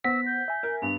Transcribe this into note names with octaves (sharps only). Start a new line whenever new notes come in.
B3 C5 F#5 E6 A#6 B6
G6
E5 G#5
A#4
G2 B3 F7